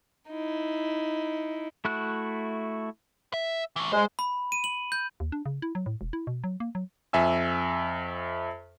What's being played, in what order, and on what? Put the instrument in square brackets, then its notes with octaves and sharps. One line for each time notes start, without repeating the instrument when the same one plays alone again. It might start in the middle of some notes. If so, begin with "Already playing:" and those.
[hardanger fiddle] D#4 E4
[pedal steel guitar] A3 E4 F#4 F#6
[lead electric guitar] E5
E3 A3
[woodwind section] G#3 [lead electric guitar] C5
[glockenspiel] B5
D#7
F#7
G6
[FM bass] D#2
D4
C#3
E4
F#3
A2
E1
E4
B2
F#3
A#3
F#3
[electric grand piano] F2 E5 G#5 E6